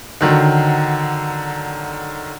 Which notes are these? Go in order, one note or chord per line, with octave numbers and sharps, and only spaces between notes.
D3 D#3 F#3